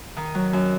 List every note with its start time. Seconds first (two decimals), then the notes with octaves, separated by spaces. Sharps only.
0.17 D#3 D#4
0.35 F#3
0.53 F#2